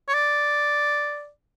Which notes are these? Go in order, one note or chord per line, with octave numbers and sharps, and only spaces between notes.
C#5
D5